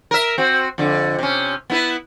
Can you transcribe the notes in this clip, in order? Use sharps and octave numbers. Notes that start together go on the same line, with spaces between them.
A#4 E5
C4 F#4
F2 D3
C3 C#4
B3 E4 B4